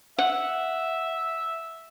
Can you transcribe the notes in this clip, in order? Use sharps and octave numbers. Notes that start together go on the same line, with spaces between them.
E5 F#5